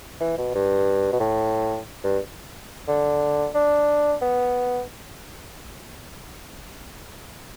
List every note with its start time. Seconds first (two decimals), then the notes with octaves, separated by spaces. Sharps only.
0.20 E3
0.38 B2
0.54 G2
1.13 B2
1.20 A2
2.04 G2
2.88 D3
3.55 D4
4.22 B3